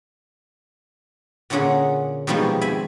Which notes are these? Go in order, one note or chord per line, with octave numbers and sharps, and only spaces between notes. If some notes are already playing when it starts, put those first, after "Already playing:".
A#2 D3 A#3 C#4 G#4 F#5
B2 D#3 F3 G3 G#3 A#3
C4 E5 G#5 B5